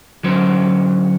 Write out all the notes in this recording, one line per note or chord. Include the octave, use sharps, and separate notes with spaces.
D3 F#3 C#4 A#4 C5